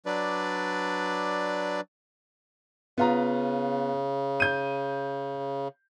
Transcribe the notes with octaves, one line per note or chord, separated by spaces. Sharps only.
F#3 D4 B4 D5
C#3 B3 F4 A#5
G6 D#7